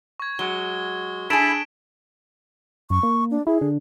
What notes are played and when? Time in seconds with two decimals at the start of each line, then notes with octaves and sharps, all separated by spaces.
0.20 C#6 G#6
0.39 F#3 G#3 G7
1.30 D4 E4 G#4 A4 B5 B6 D7 E7
2.90 F#2 C#6
3.03 A#3
3.31 D4
3.47 E4 G#4
3.61 D3